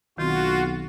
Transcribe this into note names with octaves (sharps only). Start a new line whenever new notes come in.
B1 D#3 C4 F4 F#4